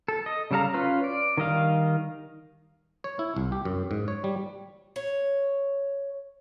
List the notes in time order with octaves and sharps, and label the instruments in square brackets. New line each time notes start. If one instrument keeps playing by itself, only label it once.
[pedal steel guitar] A4
D#5
C#3 G3 A4 F5 A#5
C#4 F4 B4 F5
D5
D#3 G3 D#5 F5
[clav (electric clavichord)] C#5
E4
C2
G4
F#2
G#2
C#5
G3
[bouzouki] C#5